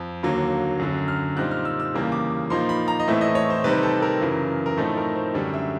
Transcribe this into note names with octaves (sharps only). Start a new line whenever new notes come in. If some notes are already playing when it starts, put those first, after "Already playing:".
Already playing: F2
D#2 D3 F#3 A#3
F#2 D3 F#3
F6
A#2 G3 C4 D#4 F#6
F6
E6
E6
E2 C#3 E3 G3 A#3
D6
A#2 F3 A#3 D#4 C6
B5
A#5
D#5
A2 E3 A3 C4 E5
D#5
C#5
C5
C3 D#3 G3 C4 D#4 B4
A4
A#4
F#2 C#3 E3
A#4
A2 F3 A3 C4 D#4 A4
A#4
C5
F#2 D3 G3 C#5
E5